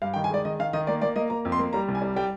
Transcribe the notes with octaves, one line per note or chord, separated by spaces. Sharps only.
G2 F5
D#3 G5
G#5
G#3 D5
D#3 D#5
D#3 F5
D#3 D#5
A#3 D5
A#3 D5
A#3 D#5
A#3 A#5
F2
C6
A#3
G3 A#5
C2
G#5
G3
G3 G5